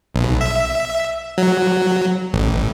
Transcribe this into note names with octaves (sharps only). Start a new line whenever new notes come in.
B1
E5
F#3
A1